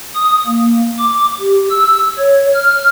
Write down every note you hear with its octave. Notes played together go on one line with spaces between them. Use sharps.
D#6
A#3
D6
G4
E6
C#5
F6